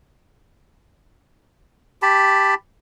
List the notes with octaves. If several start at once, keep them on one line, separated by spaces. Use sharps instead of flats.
G4 A5 B5